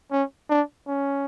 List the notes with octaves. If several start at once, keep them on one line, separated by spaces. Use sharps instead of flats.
C#4
D4
C#4